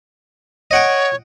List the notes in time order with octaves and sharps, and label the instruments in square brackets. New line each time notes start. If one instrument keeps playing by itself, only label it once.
[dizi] C#5 [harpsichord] D#5 F#5 G5